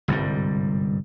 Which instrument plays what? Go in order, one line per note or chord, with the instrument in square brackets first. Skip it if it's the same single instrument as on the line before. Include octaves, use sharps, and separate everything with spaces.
[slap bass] G1 C2 G#2 G3